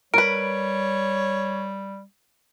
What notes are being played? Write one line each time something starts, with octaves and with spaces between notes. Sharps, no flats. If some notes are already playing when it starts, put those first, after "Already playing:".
G3 A#4 B4 C#5 D7